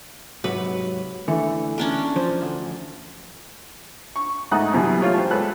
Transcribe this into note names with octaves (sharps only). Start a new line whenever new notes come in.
G#2 C3 F#3 B4
D3 E3 A3
C#4 D4 A#4
F3 C5
D2
C#6
G#2 A3 D#4 F#5 D#6 F#6
F#2 B2 E3 G3
A3 F4 C#5
C5 G5 A5
G#3 G4 A4 B4 F#6